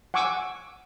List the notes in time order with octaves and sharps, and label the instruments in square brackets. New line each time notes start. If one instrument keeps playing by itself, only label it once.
[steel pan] F#5 G#5 C#6 D6 E6